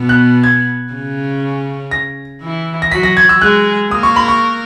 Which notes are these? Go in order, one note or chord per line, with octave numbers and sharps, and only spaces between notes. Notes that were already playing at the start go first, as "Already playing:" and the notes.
Already playing: B2 B3
F#6
G#6
C#3 C#4
A#6
E3 E4
A#6
F#3 F#4 B6
A#6
G#6
E6
G#3 G#4 F#6
A#3 A#4 D#6
C#6
B5
C#6